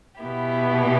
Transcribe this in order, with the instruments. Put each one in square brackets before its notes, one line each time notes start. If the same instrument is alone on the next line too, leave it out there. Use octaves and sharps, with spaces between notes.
[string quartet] B2 B3 E4 G4